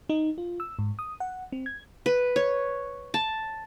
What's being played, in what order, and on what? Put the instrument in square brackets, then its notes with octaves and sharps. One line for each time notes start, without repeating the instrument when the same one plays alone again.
[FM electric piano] D#4
F4
E6
G#2
D#6
F#5
C4
G#6
[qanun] B4
C#5
A5